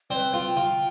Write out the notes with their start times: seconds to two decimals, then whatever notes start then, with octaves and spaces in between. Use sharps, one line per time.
0.10 C4 B4 D5
0.34 F4 G5
0.57 F4